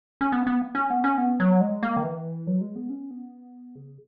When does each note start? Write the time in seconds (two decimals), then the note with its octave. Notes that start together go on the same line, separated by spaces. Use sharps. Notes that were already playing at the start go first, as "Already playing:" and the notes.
0.21 C#4
0.32 B3
0.47 B3
0.75 C#4
0.90 B3
1.04 C#4
1.18 B3
1.40 F#3
1.61 G#3
1.83 A#3
1.97 D#3
2.03 E3
2.47 F#3
2.61 G#3
2.76 B3
2.90 C#4
3.11 B3
3.76 C#3